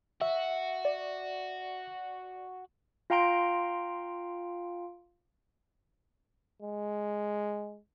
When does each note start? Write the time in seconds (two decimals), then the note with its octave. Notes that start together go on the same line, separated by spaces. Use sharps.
0.22 F#4 E5
0.85 D5
3.10 F4 F5 G5 A#5 C6 D7
6.62 G#3